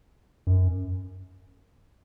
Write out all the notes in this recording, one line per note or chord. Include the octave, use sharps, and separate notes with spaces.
F#2